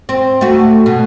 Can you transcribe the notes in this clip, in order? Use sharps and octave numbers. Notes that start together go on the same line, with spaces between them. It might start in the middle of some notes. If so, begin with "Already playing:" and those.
C4
A3 F#4
B2